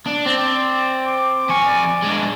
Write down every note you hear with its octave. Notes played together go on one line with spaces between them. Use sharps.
D4
C4 D5
D6
F2 G#5 C#6
D5
G#3 D4